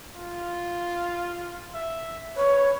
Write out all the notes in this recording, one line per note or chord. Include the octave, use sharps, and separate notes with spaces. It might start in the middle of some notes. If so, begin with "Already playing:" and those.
F4
E5
B4 C#5